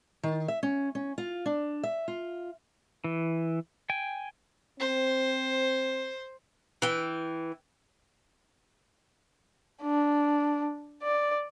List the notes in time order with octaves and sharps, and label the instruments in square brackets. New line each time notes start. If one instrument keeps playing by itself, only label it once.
[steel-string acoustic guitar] D#3
E5
C#4
C#4
F4
D4
E5
F4
[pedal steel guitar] E3
G5 G#5
[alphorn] C4 [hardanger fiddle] C5
[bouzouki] E3 G5
[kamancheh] D4
D5